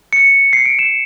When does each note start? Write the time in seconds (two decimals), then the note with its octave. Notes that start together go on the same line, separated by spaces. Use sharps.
0.13 C#7
0.53 C7
0.66 D7
0.79 E7